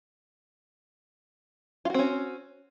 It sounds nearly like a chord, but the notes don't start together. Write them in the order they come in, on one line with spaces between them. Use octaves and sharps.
F4 F#4 C4 C#4